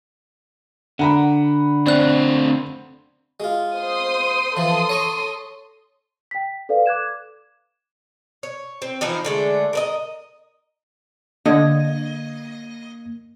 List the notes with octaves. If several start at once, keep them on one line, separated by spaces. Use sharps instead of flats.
D3 F#5 A#5 B5
A3 C4 C5 D5 F#6
G#3 F4
C5 C6 D#6
E3 F3 A4 C6 D#6
C#5 A#5 C#6
G5 B6
A4 B4 D5 F5
D6 F#6 G#6 E7
C#5
C4
E3 F3 D#4 A#4
D3 G#3 A3
A#4 B4 D#5
D3 A#3 D#5 G#6